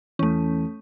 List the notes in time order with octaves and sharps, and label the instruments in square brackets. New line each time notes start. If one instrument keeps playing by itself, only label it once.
[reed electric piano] E2 E3 [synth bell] A3 C#4